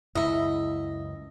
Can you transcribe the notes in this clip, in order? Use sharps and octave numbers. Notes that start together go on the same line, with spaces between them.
C#2 F#2 E4 D#5 E5